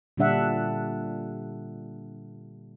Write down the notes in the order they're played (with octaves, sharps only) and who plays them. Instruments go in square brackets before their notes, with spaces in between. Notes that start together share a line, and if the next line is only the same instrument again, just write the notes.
[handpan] A#2 D3 G3 D4 E5 F#5